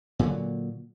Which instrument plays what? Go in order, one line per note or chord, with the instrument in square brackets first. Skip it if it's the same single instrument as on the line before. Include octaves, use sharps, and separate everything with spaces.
[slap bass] A#2 D3 F#3